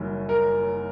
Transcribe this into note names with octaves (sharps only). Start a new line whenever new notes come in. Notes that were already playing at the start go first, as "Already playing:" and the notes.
Already playing: F#1 F#2 D#3 G3
A#4